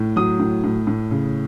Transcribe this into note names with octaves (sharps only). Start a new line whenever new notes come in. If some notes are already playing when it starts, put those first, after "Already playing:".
Already playing: A2
F#3 D#6
A2
A2
A2
C#3